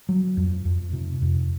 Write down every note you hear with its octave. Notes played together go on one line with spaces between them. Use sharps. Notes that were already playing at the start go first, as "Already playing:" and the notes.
F#3
F2
F2
C3
F2